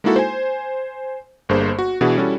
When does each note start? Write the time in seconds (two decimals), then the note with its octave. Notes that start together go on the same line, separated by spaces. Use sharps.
0.04 G#3 A#3 D#4 E4 F#4 A4
0.16 C5 G#5
1.49 G1 G2 A#3 G#4 C5
1.79 F#4
2.01 B2 E3 D4 E4 F#4 G#4
2.17 G3 C#4 E4 F#4 A4